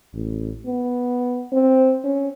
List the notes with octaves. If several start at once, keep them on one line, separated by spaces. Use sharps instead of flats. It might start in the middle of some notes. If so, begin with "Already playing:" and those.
A1
B3
C4
C#4